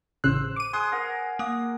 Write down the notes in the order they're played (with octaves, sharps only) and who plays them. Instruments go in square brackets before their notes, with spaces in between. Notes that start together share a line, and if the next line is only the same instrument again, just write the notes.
[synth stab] A1 C#3 F#6 [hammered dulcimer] C5 [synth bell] E6
[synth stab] D6 D#7
[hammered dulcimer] G#4 [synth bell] C6 D#6 F#6
[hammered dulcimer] A#4 F#5
[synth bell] A#3 D#6